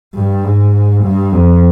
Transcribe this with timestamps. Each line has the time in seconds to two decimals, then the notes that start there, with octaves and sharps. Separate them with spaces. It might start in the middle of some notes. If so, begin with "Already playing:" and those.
0.14 G2
0.44 G#2
1.03 G2
1.32 F2